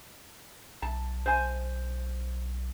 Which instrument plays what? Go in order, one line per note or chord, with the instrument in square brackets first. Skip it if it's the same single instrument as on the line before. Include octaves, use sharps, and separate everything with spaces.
[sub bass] B1 [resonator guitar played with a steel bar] A5
[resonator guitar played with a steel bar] C5 G#5